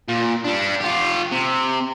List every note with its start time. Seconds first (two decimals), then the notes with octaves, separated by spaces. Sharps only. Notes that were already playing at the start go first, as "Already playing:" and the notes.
0.08 A#2
0.44 G3 D4
0.81 F4 G4
1.32 C3